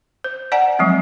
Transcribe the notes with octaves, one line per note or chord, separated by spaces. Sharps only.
C5
D5 F#5 G#5 A#5
F3 F#3 G#3 C4